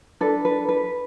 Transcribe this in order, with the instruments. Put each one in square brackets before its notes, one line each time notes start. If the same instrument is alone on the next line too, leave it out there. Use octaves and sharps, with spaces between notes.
[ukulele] D4 A4 B4
B4
B4